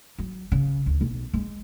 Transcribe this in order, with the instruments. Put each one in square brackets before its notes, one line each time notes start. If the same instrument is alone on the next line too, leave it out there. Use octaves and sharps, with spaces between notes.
[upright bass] F#3
C#3
D2
B1
G#3